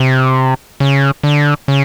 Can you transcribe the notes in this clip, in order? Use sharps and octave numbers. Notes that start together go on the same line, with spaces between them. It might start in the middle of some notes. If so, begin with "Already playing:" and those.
Already playing: C3
C#3
D3
C#3